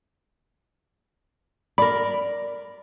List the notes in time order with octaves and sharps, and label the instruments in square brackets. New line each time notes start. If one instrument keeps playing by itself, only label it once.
[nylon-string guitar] A#4 D5 [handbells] B5